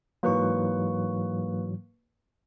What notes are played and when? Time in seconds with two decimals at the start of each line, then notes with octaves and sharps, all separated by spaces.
0.23 G#2 E3 F#3 A#3 B4 C#6